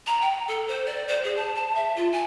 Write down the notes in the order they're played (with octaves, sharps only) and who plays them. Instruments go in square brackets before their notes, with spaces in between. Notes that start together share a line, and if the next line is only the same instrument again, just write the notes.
[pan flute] A#5
G5
A4
C5
D5
C5
G#4
A5
A5
E5
F4
G#5